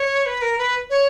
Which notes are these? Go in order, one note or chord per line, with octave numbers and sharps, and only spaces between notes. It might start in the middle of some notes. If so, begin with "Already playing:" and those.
Already playing: C#5
B4
A#4
B4
C#5